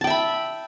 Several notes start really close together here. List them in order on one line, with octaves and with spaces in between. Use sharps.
A5 G5 E5 B5